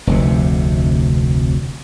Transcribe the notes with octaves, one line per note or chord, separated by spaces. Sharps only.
F1 D2 C3